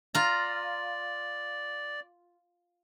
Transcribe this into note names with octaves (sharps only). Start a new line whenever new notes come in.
F4 D5 A#5